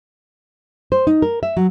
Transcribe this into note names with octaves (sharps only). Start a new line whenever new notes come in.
C5
D#4
A#4
E5
F#3